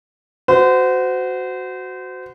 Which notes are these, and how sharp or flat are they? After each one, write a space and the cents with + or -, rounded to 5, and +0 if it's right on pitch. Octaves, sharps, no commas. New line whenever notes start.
F#4 +0 C5 -30